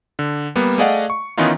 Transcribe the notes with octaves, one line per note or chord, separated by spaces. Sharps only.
D3
G3 A#3 B3
A3 G#4 D5 D#5 F5 F#5
C#6
D#3 E3 B3 C#4 D#4 F4